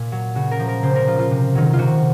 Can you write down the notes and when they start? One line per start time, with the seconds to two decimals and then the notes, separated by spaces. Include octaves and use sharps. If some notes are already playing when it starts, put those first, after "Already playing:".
Already playing: A#2
0.12 F#3
0.35 C#3 F#4
0.51 A#4
0.59 F3
0.68 A#4
0.83 C#3 C5
0.95 A#4
1.07 F3 F4
1.19 F4
1.31 C3
1.55 D#3 F#3
1.73 F4
1.78 C3 F#4